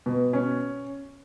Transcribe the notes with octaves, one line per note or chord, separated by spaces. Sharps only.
B2
C#4